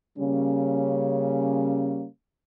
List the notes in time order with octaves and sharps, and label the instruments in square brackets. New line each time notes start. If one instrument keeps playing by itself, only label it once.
[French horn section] C#3 G3 A#3 C#4